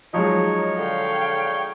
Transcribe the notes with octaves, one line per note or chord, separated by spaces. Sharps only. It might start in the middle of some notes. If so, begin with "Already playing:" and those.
F3 F#3 G#3 D#4 C#5
D3 F5 G5